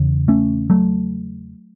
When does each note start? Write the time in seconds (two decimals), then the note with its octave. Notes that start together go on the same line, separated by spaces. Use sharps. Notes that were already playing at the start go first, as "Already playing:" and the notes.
Already playing: E2 C#3
0.28 A3 C#4
0.70 F#3 A3